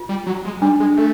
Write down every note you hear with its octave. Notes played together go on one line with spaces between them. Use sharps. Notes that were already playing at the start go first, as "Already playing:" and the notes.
Already playing: F4
G3
F#3
G#3
G3 D4
G#3
A3